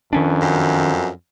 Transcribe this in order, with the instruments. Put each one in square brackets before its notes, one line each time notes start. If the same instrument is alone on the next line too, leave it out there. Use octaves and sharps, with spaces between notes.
[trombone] F2 [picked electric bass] D#3 C#4 D4
[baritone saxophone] F#2